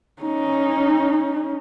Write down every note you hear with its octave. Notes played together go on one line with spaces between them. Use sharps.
C#4 D#4